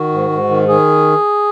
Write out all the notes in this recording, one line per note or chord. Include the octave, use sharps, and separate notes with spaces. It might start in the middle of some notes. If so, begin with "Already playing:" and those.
Already playing: D#3 F#4
G#2
G#2
D#3
D#3 G#4